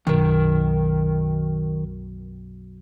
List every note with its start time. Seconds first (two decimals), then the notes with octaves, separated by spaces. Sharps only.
0.07 B1 F#2 D#3 A#4